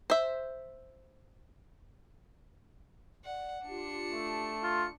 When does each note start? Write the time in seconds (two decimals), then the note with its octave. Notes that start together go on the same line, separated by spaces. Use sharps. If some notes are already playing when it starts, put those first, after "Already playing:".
0.10 C5 E5
3.24 D5 F#5
3.67 D4 F4 G4 C#7
4.12 A3
4.63 F4 C6